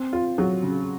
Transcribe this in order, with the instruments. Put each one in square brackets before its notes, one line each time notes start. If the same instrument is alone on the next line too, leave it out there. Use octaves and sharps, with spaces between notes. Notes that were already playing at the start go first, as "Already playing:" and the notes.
Already playing: [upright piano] C4
F4
F#3
C#3